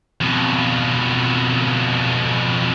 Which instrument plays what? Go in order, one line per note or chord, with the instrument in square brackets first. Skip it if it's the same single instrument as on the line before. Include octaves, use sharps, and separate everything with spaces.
[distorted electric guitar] F2 B2